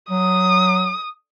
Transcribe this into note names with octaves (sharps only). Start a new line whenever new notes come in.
F#3 D#6